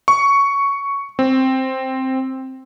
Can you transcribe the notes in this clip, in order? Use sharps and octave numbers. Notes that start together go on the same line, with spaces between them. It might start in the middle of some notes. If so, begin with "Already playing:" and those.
C#6
C4